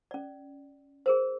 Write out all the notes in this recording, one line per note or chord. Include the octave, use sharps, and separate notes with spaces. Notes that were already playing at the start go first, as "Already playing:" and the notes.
C#4 D5
G#4 A#4 C5